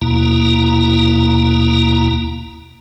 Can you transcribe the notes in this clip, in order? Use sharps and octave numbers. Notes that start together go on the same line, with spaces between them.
D#2 B2 A#3 E4 A#5